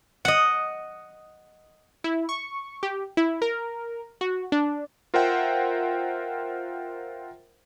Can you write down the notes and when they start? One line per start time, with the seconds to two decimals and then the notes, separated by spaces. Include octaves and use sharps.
0.25 D#5 F#5
2.04 E4
2.29 C#6
2.83 G4
3.17 E4
3.42 A#4
4.21 F#4
4.52 D4
5.14 F4 A#4 C5 E5 F#5 G5